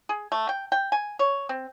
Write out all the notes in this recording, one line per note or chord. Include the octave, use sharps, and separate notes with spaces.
G#4
A3
G5
G5
G#5
C#5
C4